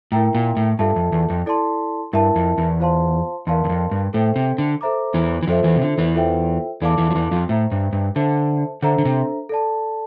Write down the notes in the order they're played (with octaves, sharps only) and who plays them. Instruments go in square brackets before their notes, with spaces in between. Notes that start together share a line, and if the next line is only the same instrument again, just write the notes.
[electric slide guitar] A2 [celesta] E4 A#4 E5 G5 A#5
[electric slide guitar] A#2
A2
[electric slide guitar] G2 [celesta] F4 A4 E5 A5
[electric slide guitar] F2
E2
F2
[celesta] E4 A4 D5 A5 C6
[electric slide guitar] G2 [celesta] E4 A#4 E5 A5
[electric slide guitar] F2
E2
[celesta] F4 C5 F5 A5 C6
[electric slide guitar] E2 [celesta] A#4 D5 F5 A5 C6
[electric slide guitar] E2
F2
G2
[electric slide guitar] A2 [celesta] A4 C5 E5 G5
[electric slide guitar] C3
D3
[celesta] A4 C5 E5 A#5 D6
[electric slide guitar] E2 E3
E3
[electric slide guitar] F2 F3 [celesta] F4 A4 C5 E5
[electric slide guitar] E2 E3
C3
D3
E2 E3
[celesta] F4 A4 C5 E5 G5
[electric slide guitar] E2 E3 [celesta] A4 D5 F5 A5 D6
[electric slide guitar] E2 E3
F3
E2 E3
F2 F3
[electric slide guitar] A2 [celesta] C5 E5 A#5
[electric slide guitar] G2
G2
[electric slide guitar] D3 [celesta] A4 C5 E5 A5
[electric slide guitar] D3 [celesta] D4 A4 C5 E5 A#5
[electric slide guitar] D3
C3
[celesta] A4 D5 A5